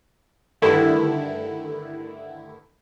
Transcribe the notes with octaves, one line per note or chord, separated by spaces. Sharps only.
G2 D3 D#3 A3 E4